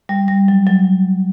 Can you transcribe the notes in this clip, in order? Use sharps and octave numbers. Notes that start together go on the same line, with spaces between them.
G3
G3
F#3
F#3